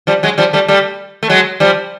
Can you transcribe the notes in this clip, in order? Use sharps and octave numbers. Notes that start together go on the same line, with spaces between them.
F3 G3
F#3 G#3
F3 G3
G3 A3
G3 A3
A3
F#3 G#3
F3 G3